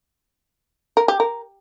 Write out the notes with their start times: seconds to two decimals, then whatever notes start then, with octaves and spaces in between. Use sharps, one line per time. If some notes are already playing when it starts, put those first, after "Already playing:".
0.97 A#4
1.08 G4
1.20 A#4